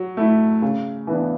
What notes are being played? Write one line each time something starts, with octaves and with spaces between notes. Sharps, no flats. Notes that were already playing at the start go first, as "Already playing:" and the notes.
Already playing: F#3
A3 E4
C#3
E3 B3 D4